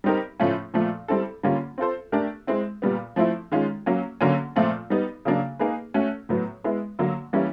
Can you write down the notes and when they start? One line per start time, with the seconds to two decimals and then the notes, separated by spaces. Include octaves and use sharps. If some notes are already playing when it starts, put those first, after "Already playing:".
0.04 G3 C4 D#4 G4 A#4
0.40 A2 F3 A3 C#4 F4
0.74 A#2 F3 A3
1.08 G3 C4 E4 A4
1.43 D3 G3 A#3 C#4 F4
1.78 C4 F4 A4 C5
2.12 A3 D4 G4 A#4
2.47 G#3 C4 E4
2.82 A#2 G3 B3
3.16 F3 A3 C4 E4
3.52 D#3 G#3 C#4 F4
3.86 F#3 A#3 C#4
4.21 D3 F#3 A#3 C#4
4.56 A#2 F3 A3 C4 F4
4.90 G3 B3 D#4
5.25 C#3 F#3 A#3 D4
5.59 A#3 D#4 G#4 B4
5.94 A3 C#4 F#4
6.29 A2 F#3 B3
6.64 G#3 B3 E4
6.99 D3 F#3 A#3
7.33 E3 G3 A#3 C#4 E4